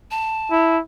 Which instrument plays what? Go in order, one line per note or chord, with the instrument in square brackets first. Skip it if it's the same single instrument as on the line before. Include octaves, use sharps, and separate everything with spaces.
[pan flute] A5
[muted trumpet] E4